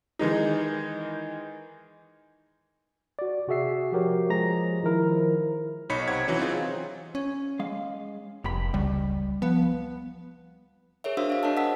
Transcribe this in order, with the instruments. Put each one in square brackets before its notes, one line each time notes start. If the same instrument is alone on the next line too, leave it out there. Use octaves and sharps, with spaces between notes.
[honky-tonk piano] D#3 E3 G#3 D#4
[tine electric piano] F#4 D5
C3 F#4 G#4 E5 C7
F3 F#4 G4 A#4 C#5
F3 G#3 G#4 A#5 A#6
D#3 F3 E4 A#4
[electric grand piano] B1 D#4 C#5 B5 B6 C#7
C3 C4 C#5 F#5 G#6
E3 F#3 C#4
C4 D#4 F4 G#4
[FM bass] C#4
[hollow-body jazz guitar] G#3 F5
[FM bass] F1 [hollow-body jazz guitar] G#2 G4 B5
[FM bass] C#2 [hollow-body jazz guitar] G3
[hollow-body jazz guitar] F3 [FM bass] B3
[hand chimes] G#4 A#4 C#5 E5
D4 F#4 C5 E5 F5 E6
G#4 D#5
D4 A#4 C#5 D#5 A5
F#5 E6 B6